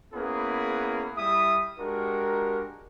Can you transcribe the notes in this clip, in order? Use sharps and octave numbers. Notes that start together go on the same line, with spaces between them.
A#3 B3 C#4 E4 G#4 B4
G3 E4 E5 D#6
G#3 D4 F#4 G4 A#4